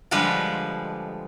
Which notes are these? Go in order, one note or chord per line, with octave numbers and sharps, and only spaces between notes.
D3 F3 G3 G#3 B4